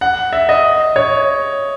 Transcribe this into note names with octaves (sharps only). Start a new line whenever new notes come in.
F#5
E5
D#5
C#5